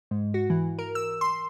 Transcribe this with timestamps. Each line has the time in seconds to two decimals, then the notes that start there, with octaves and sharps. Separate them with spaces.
0.11 G#2
0.34 F#4
0.50 E3
0.79 A#4
0.95 E6
1.21 C6